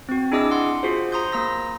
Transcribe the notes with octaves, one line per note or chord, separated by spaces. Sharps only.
C4 F#4
D4 E4 G#4 D#5 D6 E6
F#5 C6
F4 F#4 G#4 C5
C5 A#5 C6 D#6 G6
A#3 A#5 E6 A#6